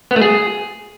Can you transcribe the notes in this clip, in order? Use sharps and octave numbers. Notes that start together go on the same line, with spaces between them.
B3
A3
G#4